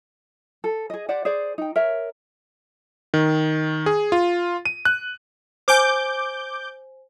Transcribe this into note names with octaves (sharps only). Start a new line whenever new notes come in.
A4
G#4 D#5
G4 C5 D5 F#5
G#4 C5 D5
D#4 G5
A#4 C#5 E5
D#3
G#4
F4
D#7
F#6
C5 G#5 D6 G6